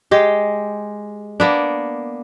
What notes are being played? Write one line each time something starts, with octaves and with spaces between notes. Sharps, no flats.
G#3 G4
A#3 B3 D4